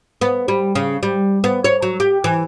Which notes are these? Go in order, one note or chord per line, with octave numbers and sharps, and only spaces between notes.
B3
G3
C#3
G3
B3
C#5
F#3
G4
E3